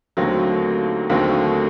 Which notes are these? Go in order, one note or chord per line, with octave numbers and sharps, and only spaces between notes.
D#2 D3 F#3 A3 C4
D#2 D3 F#3 A3 C4